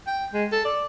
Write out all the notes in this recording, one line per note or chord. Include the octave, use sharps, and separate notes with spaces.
G5
G#3
A4
D5